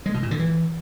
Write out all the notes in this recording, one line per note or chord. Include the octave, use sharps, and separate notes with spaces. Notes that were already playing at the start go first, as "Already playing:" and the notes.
G#3
B2
A#2
D3
E3